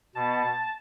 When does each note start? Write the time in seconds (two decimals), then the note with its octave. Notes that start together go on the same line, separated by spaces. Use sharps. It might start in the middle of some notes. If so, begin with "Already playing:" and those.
0.15 B2 B3 A5